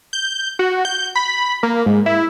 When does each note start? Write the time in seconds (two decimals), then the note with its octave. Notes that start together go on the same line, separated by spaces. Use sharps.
0.13 G6
0.59 F#4
0.85 G6
1.15 B5
1.63 A#3
1.86 G#2
2.06 E4